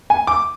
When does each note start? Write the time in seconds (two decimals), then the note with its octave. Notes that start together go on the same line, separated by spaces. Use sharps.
0.10 G#5
0.27 D6